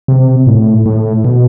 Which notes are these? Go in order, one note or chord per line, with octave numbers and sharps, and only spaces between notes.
C3
A2
A2
B2